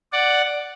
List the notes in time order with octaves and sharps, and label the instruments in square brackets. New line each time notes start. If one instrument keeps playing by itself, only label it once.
[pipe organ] D5 F#5